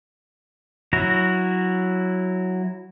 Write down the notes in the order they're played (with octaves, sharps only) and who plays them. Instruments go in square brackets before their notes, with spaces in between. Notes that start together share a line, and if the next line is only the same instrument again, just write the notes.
[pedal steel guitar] F#3 E4 F#4 A#5